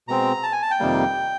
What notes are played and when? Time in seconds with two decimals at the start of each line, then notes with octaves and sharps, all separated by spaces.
0.08 B2 G#3 C4 A#5
0.43 A5
0.53 G#5
0.62 A5
0.71 G5
0.80 F2 C3 D#3 G3 A#3